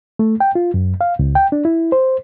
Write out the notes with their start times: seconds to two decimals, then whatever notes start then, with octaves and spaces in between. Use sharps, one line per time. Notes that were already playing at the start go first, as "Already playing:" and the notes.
0.19 A3
0.40 G5
0.55 F4
0.74 F#2
1.01 F5
1.19 C#2
1.35 G5
1.52 D4
1.65 E4
1.92 C5